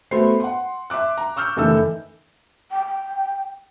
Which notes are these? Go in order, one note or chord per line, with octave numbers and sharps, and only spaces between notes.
A3 B3 F#4 C5 C6 C7
F#5 C6
E5 C6 D6 F#6
A#5
C#6 E6 F6 G6
F#1 D#3 E3 A3 A4 E6
G5